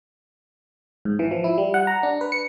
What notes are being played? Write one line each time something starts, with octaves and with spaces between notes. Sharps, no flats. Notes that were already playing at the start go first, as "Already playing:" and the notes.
G#2
E3
F3
E4
G3
F#5
A#5
D4
B4
C#7